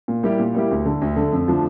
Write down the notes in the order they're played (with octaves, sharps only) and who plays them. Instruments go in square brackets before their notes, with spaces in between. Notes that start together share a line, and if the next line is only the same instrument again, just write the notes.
[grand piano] A#2
G3 A#3 E4 G4
A#2
G3 A#3 E4 G4
D2
D3 A3
D2
D3 A3
F2
D3 F3 A3 D4